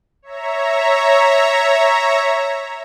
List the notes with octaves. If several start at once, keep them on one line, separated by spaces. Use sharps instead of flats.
C#5 E5 A#5